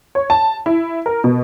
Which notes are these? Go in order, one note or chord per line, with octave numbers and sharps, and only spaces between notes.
C#5
A5
E4
A#4
B2